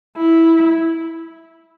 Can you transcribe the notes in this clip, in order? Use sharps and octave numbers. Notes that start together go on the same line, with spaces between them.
E4